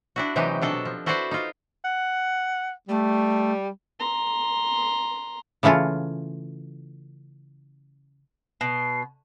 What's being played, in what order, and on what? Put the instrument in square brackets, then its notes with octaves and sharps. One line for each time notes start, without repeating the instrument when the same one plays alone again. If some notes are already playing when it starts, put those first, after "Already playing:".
[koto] D4 E4 F#4
C3 E3 F#3 G#3 D#4 G4
B2 D4 A4 D#5
F3
E4 F#4 A4 B4 C5 D5
D#4 F4
[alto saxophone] F#5
[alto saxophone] G3 [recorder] A3
[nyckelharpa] A#5 C6
[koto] C#3 E3 A3 C#4 F4
[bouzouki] B2 [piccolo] C7